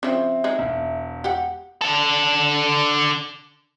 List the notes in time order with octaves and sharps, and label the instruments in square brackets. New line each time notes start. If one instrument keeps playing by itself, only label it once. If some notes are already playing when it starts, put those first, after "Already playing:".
[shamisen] C#3 F3 [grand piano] C4 [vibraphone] E5
[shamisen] G#3 D#4
[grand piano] E1
[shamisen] G4 F#5
[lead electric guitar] D3 A4